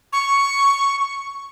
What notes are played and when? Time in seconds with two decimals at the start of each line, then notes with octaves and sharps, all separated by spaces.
0.13 C#6